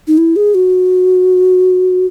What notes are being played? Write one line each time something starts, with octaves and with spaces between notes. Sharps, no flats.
D#4
E4
G#4
F#4